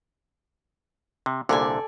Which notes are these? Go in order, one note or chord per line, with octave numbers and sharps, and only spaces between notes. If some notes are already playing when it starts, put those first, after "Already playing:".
C3
C2 A#2 D3 A4 D5 G#5